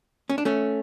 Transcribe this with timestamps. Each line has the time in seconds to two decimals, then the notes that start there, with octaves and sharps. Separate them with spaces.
0.30 C#4
0.38 D4
0.45 A3 C#4